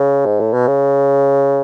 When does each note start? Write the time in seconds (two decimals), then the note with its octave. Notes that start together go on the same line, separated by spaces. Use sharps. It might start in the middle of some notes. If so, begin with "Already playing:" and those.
Already playing: C#3
0.26 G#2
0.40 A2
0.53 B2
0.68 C#3